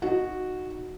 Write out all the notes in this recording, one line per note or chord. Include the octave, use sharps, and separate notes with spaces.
D#4 F#4